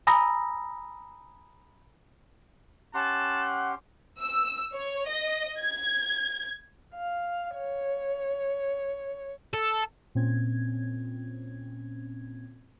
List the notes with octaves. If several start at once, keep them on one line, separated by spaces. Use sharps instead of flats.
G#5 A#5 B5 D#6 E6 A#6
C#4 G4 F#5 A5 C6 F#6
E6
C#5
D#5
G#6
F5
C#5
A4
A#2 C4 C#4 G#6